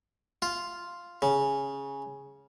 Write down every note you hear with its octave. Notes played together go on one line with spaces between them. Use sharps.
F4
C#3